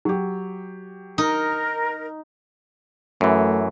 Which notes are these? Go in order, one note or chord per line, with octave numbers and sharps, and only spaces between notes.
F#3 G4
D#4 A#4
F#2 E3 A3